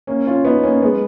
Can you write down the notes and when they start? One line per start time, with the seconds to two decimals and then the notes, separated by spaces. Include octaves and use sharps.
0.07 A#3 C#4
0.26 C#4 F4
0.45 B3 D#4
0.63 A#3 C#4
0.82 G#3 B3